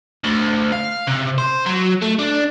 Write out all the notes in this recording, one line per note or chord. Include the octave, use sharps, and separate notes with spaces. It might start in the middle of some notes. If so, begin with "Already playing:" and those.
D2
F5
C3
C5
F#3
A3
D4